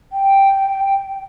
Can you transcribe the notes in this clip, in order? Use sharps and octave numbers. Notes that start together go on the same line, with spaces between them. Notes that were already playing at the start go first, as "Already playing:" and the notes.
G5